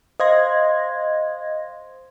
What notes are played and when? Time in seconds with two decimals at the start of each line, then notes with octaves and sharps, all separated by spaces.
0.20 C5 D#5 F5 C6 G#6 A#6